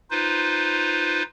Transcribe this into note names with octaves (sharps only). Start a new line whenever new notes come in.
D#4 F4 B4 C5